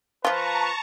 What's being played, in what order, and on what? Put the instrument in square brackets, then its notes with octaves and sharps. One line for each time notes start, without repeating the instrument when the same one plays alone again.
[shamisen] F3 F4 [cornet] B4 [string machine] A5 A#5 C#6